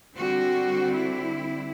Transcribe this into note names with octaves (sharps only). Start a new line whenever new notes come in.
D3 G3 C4 F#4
E4